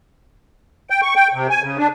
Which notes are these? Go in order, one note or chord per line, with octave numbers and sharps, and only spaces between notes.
G5
C#6
G5
C3
G#5
C#3
D4